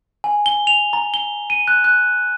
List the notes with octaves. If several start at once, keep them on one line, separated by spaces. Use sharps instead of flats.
G#5
G7
F7
A#5
G7
D#7
F#6
F#6